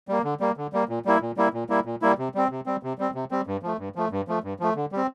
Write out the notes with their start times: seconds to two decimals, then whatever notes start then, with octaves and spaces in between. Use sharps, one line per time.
0.08 G3 A#3
0.24 D3
0.40 G3 A#3
0.57 D3
0.73 G3 A#3
0.89 A#2
1.05 G3 A#3 E4
1.22 A#2
1.37 G3 A#3 E4
1.54 A#2
1.70 G3 A#3 E4
1.85 A#2
2.02 G3 A#3 E4
2.18 C3
2.35 G3 C4
2.50 C3
2.66 G3 C4
2.83 C3
2.99 G3 C4
3.15 C3
3.31 G3 C4
3.47 G2
3.63 F3 A3
3.79 G2
3.95 F3 A3
4.11 G2
4.28 F3 A3
4.44 G2
4.59 F3 A3
4.76 D3
4.92 G3 C4